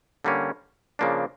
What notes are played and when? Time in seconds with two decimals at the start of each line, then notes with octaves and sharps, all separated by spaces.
0.25 D3 G3 A#3 C#4
0.99 C#3 F3 A#3 D4